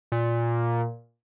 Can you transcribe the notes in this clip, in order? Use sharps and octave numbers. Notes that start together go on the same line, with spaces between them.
A#2